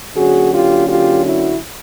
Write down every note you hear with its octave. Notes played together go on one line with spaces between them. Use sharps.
D3 F#3 A#3 C#4 F#4 G#4
F4 G4
F4 G4
E4 F#4